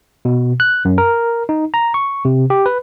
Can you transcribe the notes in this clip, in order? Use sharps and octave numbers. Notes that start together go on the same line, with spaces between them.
B2
F#6
F#2
A#4
D#4
A#5
C#6
C3
G4
B4